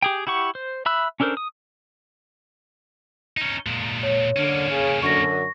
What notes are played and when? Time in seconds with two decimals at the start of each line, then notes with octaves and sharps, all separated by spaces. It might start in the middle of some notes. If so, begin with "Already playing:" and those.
0.02 G4 G#4 G5
0.27 E4 G4 F#5 C#6
0.55 C5
0.86 E5 B5 E6 F#6
1.20 C#4 D4 A4 A#4 C5
1.37 D#6
3.37 C#4 D#4
3.66 A#2 G#3
4.03 C#5
4.36 D3 A#3 C#4
4.70 C#3
5.03 F#2 D3 C#6 A#6